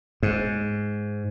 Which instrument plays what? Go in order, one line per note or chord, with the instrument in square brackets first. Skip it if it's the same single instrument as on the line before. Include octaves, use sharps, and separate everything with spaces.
[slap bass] G#2